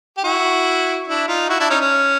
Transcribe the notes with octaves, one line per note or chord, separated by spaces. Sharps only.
G4
E4 F#4
D4 E4
D#4 F4
E4 F#4
D4 E4
C#4 D#4
C#4